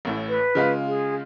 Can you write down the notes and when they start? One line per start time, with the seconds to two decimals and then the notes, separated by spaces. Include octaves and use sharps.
0.05 A1 A2 E4
0.29 B4
0.55 C#3 G#3 F4
0.87 G#4